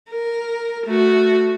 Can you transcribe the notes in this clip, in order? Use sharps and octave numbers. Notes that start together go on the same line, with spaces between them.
A#4
A3 F#4